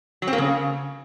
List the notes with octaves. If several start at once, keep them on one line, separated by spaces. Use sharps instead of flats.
F#3
C4
A#3
C#3